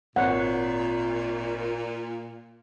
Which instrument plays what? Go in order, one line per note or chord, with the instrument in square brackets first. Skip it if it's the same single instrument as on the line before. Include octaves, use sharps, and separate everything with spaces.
[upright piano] G#1 C#5 [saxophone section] A#2 [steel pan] F#5